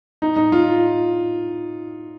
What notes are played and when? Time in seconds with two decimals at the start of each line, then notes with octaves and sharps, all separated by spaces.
0.22 D#4
0.36 D#4
0.52 F4